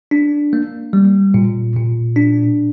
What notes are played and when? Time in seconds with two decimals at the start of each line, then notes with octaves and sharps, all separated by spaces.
0.11 D4
0.53 A#3
0.93 G3
1.34 A#2
1.76 A#2
2.16 D4